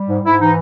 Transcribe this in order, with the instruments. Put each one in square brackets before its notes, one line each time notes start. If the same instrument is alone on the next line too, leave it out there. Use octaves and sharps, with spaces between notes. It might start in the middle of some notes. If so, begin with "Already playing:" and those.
Already playing: [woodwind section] G3
G#2
G#2 E4
E3 D#4